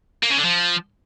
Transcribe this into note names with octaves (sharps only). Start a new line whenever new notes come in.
A#3
C#3
D3
F3